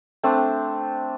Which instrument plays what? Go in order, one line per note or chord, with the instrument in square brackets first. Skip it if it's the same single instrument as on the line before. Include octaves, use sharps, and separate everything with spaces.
[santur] A3 C4 D4